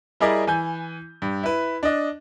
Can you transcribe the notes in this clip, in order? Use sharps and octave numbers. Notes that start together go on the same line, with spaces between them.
G3 E4 G#4 A#4 D5 D#5
E3 G#5 G6
G2
E4 B4
D4 D#5